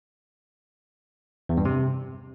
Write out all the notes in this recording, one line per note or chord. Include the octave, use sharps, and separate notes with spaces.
E2
G2
C3